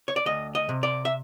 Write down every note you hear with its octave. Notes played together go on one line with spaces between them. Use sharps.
C#5
D5
D2 D#5
D#5
C3
D5
E5